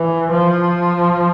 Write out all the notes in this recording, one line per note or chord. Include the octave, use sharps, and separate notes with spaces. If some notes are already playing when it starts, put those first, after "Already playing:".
Already playing: E3
F3